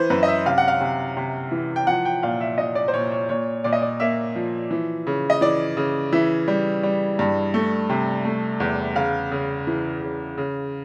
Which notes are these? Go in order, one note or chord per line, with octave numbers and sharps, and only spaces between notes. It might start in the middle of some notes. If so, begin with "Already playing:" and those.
Already playing: E3 B4 C5
F#2 B4
D#5
E5
C3 F5
F#5
F5
C3
C3
E3
G5
F3 F#5
G5
A#2 F5
E5
A#2 D#5
D5
C5
A#2 C#5
C#5
A#2 C#5
A#2 D5
D#5
D5
A#3 E5
F3
E3
C#3
D#5
E3 D5
C#3
E3 E5
G3
G3
G2
A3
C3
A3
E2
C#3 F5
C#3
E3
C#3
C#3